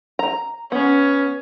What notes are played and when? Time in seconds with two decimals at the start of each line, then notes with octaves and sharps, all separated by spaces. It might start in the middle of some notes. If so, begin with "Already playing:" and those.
0.19 A#5
0.72 B3 C#4